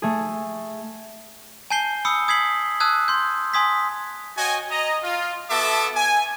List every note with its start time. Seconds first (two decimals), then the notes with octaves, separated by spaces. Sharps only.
0.02 A3 G#4
1.70 G#5 A5 G6 C7 G7
2.05 B5 D#6 E6 C#7
2.28 D#6 G#6 B6 C7 F#7
2.80 A5 D#6 E6 F#6 G#6
3.08 C6 G6
3.54 G#5 C6 D#6 G#6 B6
4.37 F#4 C#5 D#5 G5 G#5
4.71 D#5 A#5
5.03 F4
5.50 B3 F#4 A4 E5 A5 D6
5.96 G#5